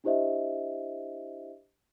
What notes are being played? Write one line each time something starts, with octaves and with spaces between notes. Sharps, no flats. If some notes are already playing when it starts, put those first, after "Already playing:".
D4 E4 G4 C5 D#5 E5